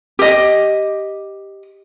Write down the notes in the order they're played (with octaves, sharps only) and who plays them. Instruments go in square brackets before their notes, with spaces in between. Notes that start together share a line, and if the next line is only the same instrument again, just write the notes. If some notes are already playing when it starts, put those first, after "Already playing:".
[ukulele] G4 D#5